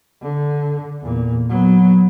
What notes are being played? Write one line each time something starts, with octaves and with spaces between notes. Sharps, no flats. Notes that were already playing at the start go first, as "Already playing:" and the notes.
D3
E2 A#2
F#3 B3